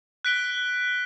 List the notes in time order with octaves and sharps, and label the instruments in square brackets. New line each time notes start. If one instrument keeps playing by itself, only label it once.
[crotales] F#6 B6 D7 G7